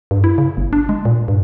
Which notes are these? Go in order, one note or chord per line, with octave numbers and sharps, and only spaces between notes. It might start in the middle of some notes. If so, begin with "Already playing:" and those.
G2
E4
C#3
G1
D4
G#3
A#2
G2